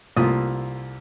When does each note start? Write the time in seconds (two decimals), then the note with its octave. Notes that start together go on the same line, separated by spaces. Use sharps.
0.16 C2 A3 A#3 F4 D#6